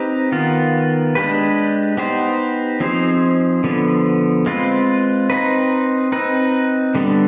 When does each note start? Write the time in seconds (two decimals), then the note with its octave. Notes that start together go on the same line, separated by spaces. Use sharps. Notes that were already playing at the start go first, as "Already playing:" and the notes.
Already playing: C4 D#4 G4 B4
0.32 D#3 B3 F4
1.15 G#3 D4 G4 B4
1.97 B3 D#4 G4 C5
2.80 F3 C4 D#4 G#4 C5
3.64 D3 F3 B3
4.46 G#3 C4 F4 B4
5.30 C4 D#4 B4
6.12 C4 D#4 B4
6.95 D3 G3 B3 D4